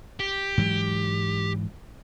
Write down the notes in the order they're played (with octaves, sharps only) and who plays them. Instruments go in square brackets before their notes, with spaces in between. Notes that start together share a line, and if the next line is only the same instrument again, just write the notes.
[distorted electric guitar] G4
[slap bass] G#2 E3 F#3